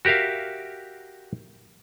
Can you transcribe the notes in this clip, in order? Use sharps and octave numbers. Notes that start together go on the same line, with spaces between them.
F#4 G4 A#4 E5 F5